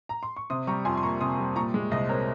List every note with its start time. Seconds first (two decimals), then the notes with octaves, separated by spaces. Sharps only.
0.09 A#5
0.23 C6
0.36 C#6
0.50 C3 C6 D#6
0.67 G3 A#5 C#6
0.85 F2 G#5 C6
0.97 C6
1.03 A#3 A#5 C#6
1.21 C3 C6 D#6
1.38 G3
1.56 A#2 A#5 C#6
1.74 G#3
1.91 C2 C5 D#5
2.09 C4 A#4 C#5